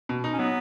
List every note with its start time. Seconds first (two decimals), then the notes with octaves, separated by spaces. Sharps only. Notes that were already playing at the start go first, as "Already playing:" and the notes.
0.09 B2
0.24 D#4
0.33 C#4
0.39 F#3 B3